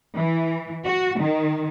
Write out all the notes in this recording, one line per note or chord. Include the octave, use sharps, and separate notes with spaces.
E3
F#4
D#3